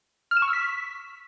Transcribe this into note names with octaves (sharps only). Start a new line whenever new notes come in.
F6
E7
C#6
E6
B6